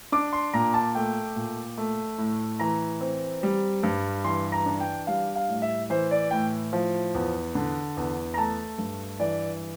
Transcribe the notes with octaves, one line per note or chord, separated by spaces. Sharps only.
D4 D6
C6
A#2 A#5
A5
A3 G5
A#2
A3
A2
E3 A#5
C4
G3
G2
E3 C6
A#5
D4
G5
G3 F5
F5
A2
E5
E3 C5
D5
A2 G5
F3
E2
D3
E2
A#5
A3 A5
G2
E3 D5